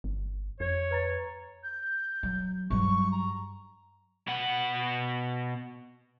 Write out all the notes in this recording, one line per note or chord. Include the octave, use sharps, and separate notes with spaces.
G1
F2 C#5 G#6
B4 A#5 A6
G6
F#3
G2 F#3 C#6
A#5
B2 F#5